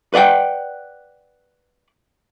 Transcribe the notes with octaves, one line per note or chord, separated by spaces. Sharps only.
B4 D5 F#5 G5